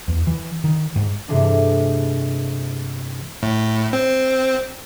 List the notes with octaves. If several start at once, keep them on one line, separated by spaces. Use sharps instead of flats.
E2
E3
D#3
G#2
G2 C3 E3 G#3 A3 D4
A2
C4